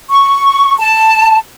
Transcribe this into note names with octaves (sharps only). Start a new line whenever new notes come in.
C#6
A5